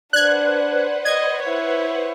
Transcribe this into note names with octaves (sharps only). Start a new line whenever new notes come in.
D4 B4 C5 D5 F#5 F#6 G#6
D#5 G#6
E4 C#5